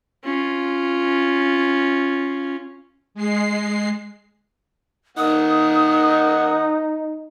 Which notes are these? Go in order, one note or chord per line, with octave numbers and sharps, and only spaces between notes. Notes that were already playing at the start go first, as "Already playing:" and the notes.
C#4 F4
G#3 C7
D#3 A#3 D#4 F#5 D#6